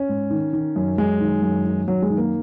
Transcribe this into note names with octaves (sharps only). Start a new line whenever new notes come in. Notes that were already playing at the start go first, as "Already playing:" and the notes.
Already playing: C#4
G#2
D#3
D#3
F#2
F#2 G#3
D#3
F#2
D#3
F#2 F#3
G#3
D#3
A#3